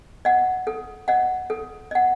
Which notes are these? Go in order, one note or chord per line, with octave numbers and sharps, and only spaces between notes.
D#5 F#5
A4
D#5 F#5
A4
D#5 F#5